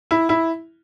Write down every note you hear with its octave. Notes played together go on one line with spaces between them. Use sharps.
E4
E4